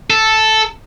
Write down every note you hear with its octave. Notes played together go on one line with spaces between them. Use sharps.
A4